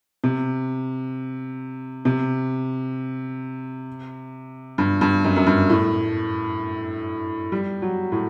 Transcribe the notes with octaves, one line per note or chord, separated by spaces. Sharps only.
C3
C3
G2
G2
F#2
F#2
G2
A2
G3
F#3
A2